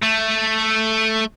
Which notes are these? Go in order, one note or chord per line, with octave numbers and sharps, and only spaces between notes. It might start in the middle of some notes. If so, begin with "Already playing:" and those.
A3